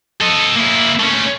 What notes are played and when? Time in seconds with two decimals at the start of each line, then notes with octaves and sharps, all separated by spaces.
0.20 A4 D#5
0.56 A#3 E4
0.99 A3 C#4